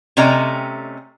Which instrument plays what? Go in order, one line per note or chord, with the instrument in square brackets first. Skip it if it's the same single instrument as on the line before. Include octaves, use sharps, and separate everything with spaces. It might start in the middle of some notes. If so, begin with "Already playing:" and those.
[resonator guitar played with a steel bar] C3 A3 C#4 D5 D#5 A#5